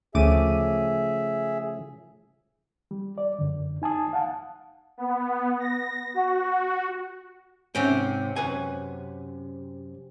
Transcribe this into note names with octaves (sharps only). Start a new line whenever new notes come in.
D2 C#3 F3 A3 G#4 E5 D6 D#7
G3
D5
F#2 D3
D#4 G#5 A5 D#6
F5 F#5 A5
B3
A#6
F#4
G#2 C3 C4 C#4 G5
F#2 B4 G#5